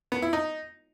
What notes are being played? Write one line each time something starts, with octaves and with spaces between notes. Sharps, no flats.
B3
E4
D#4